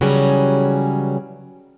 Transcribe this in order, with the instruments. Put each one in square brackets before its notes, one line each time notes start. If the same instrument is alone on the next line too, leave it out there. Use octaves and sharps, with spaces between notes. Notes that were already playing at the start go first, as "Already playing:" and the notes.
[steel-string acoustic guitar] C#3 E3 F#3 G3 C#4 G#4